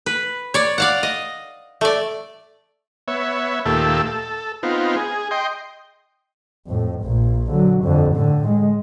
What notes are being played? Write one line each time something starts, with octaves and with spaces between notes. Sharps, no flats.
B4
C#5 D5
D5 F5 F#5
D#5
A3 D5
B3 C#5 E5
D#2 A#2 A3 G4 A4 E6
A4
B3 C4 D#4 F4
G#4
D#5 G5 C6
F2 A2
A#1 A#2
D3 F#3
F2 D3
A2 D3
G#3